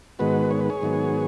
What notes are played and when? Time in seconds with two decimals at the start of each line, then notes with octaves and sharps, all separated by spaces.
0.19 G#2 D#3 G#3 B3 F#4 B4
0.51 C#5
0.61 B4
0.70 G#4 C#5
0.82 G#2 D#3 F#3 B3